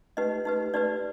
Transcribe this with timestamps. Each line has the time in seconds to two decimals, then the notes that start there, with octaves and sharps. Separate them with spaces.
0.17 D#4 G4 B4 D#5
0.45 D#4 G4 B4
0.74 D#4 G4 B4 D5